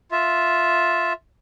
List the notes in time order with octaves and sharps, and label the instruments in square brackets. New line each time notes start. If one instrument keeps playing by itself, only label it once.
[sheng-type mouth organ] F4 E5